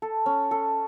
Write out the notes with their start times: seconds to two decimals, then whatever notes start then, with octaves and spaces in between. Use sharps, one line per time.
0.02 A4
0.26 C#4
0.51 A4